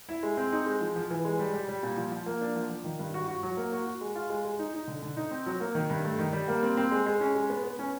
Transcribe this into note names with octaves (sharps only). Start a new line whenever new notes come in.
E4
G#3
C4
D#4
G#3
F3
F3
E3
G#3
G3
G3
G3
A#2
F3
F3
A#3
D4
F3
F3
D#3
G2
F#4
F#4
F#3
A#3
F#4
F#4
G#3
F4
G#3
G#3
D#4
D#4
D3
D3
D#4
C4
F#3
A#3
D#3
G2
A3
D#3
G3
A#3
C4
C4
G#3
G#3
C#4
G#3
B3
B3
C#4